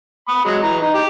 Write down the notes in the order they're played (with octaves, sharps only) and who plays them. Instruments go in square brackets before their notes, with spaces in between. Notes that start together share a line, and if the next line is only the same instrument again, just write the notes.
[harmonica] B5 D#6
F#3 G#3
E3 A#5
D#4
G4